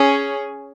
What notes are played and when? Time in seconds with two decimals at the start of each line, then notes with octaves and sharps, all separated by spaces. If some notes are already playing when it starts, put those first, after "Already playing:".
Already playing: C#4 G#4